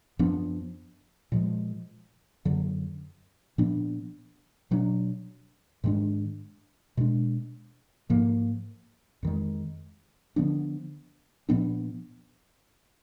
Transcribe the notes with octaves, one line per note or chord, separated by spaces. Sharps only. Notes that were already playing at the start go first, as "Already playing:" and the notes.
F#2 F3 B3 D4
A#2 F3 G#3
F#2 D3 F#3
A#2 F3 B3 D4
B2 F#3 D4
G#2 D#3 G#3 D4
B2 G#3 D4
G#2 F3 A#3
F2 D#3 G#3
D3 F3 B3 D4
A#2 F3 B3 D4